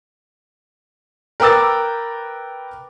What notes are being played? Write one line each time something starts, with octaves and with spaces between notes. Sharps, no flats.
A#4 B4 G5 D6 E6 A6